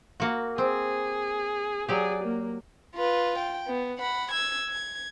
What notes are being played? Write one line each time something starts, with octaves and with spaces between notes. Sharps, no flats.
A#3 F#4
C4 G#4
F#3 G4 G#4 D5
A#3
F4 B4
G5
B3
F#5 B5
E6 G#6
G#6